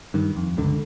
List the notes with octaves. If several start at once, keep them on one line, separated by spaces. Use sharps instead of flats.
G2 D#3
F2
G1 C#2 D3